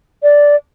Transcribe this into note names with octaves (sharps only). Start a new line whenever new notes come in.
D5